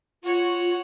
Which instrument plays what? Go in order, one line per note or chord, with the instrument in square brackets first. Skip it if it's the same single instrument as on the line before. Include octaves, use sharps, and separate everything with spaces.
[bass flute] F4 [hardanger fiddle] F#4 C#5